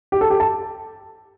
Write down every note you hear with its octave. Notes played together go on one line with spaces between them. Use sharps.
G4
A4
G4
A5